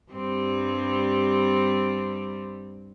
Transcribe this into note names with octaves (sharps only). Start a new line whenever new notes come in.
G2 G3 C4